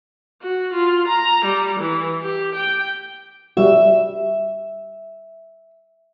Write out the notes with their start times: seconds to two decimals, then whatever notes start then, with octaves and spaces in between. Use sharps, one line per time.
0.42 F#4
0.74 F4
1.08 A#5
1.45 G3
1.80 E3
2.23 G4
2.55 G5
3.57 G3 F#4 E5